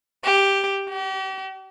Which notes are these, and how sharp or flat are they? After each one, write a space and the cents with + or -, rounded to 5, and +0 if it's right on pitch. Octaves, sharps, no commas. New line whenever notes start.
G4 +5
G4 -40